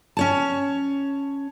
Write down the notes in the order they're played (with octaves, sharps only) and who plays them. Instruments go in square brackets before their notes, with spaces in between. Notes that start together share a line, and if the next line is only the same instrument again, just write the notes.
[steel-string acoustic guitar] C#4 C#5 A5